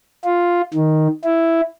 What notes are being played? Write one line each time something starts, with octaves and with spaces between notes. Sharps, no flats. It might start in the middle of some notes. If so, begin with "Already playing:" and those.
F4
D#3
E4